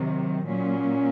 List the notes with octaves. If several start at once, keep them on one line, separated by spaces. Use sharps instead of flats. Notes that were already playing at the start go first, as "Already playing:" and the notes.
Already playing: C3 D#3 F#3
A#2 F#3 C#4